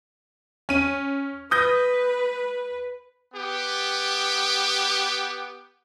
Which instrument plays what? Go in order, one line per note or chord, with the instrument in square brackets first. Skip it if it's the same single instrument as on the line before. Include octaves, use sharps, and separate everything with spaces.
[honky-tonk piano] C#4 D#7
[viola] B4 [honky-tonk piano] D#6 G6 A#6
[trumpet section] B3 G4